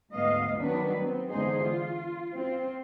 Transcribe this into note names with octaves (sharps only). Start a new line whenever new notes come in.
D2 G#2 B3 D#5 F5
D#3 F#3 B3 D4 B4
B3 C4
E2 D3 G#3 D#4 G#4 C5
F4
C4 F4